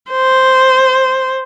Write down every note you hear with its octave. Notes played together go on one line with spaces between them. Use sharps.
C5